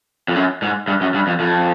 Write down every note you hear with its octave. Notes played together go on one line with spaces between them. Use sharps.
F2
F#2
G#2
G2
F#2
G2
F2
F2